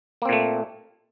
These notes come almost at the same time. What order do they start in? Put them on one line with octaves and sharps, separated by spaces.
A#3 C4 A#2 A3